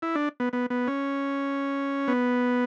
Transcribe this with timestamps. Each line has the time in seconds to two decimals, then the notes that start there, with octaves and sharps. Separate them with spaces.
0.02 E4
0.15 D4
0.40 B3
0.53 B3
0.70 B3
0.87 C#4
2.08 B3